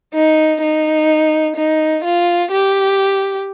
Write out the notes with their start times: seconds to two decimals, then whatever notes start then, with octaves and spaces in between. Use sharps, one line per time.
0.14 D#4
0.62 D#4
1.56 D#4
2.04 F4
2.52 G4